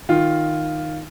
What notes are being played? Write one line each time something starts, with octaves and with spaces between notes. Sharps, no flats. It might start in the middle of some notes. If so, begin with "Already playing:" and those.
D#3 F4